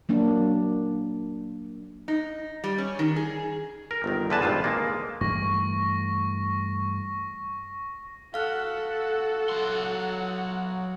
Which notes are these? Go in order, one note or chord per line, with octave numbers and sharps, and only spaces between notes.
F#3 A#3 D4
D#4
G3
C#4
D#3
G#4
A#4
G1 D#3
E2 D3 B4 G#5 A5
G#1 G2 F3 F4
G#3 A#3
G2 E3 A3 C#6 A#6
F#4 A4 F5 F#5 F6 F#6
F#3 C6